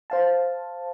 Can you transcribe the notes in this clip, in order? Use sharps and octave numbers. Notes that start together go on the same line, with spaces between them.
C5 F5 A5